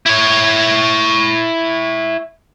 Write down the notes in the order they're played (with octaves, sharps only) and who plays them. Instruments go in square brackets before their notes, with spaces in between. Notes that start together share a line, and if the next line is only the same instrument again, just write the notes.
[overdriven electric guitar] E4 C#5